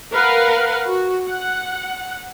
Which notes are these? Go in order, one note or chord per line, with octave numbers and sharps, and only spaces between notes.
A#4 B4 F5 F#5
F#4
F#5